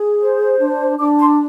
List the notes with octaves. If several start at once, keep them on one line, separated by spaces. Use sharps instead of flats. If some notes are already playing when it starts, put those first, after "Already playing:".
Already playing: G#4
C5
D4
D4 D6
C6